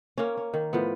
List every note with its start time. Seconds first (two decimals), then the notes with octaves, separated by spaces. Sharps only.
0.18 A#3 C#4
0.37 C#4
0.54 D#3
0.73 A2 F3 B3